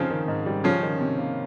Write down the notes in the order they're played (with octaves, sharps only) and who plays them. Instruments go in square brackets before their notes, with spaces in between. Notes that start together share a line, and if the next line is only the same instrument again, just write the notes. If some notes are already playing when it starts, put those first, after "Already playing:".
Already playing: [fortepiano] C#3 F3 [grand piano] C4 D#4
[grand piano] D#3
G#2
G3
[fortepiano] C#3 F3 [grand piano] C#4
[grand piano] D#3
C3
A#3